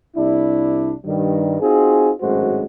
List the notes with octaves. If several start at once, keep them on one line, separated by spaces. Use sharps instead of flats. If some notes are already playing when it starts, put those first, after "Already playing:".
C2 D4 E4
G2 D#3 G3
C4 D#4 F4 F#4 G#4
G#1 F#2 A2 G#3 F#4 C5